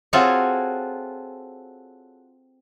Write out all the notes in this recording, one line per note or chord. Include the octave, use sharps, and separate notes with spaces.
C4 F4 F#4 G#4 A4 C#5